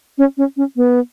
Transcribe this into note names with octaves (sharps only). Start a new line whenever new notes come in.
C#4
C#4
C#4
B3